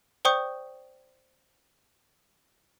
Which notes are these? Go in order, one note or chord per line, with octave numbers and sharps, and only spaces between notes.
C5 D5 G5 C#6 D#6 G6